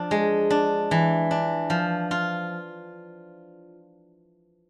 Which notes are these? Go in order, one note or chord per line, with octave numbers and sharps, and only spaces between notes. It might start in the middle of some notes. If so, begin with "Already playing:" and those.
Already playing: F3 D4
G#3
D4
E3
D4
F3
F4